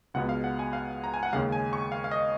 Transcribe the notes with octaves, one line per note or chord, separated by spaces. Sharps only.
C#2 B2 G#3 B3 F#5
F5
F#5
G#5
F5
A#5
G#5
F#5
D#2 C#3 G#3 F5
G#5
C#6
F5
F5
D#5